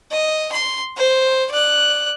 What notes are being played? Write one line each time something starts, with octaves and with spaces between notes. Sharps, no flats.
D#5
C6
C5
D5 F#6